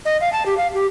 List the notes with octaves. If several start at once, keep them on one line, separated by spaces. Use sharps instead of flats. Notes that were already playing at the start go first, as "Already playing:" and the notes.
D#5
F5
A5
G4
F5
G4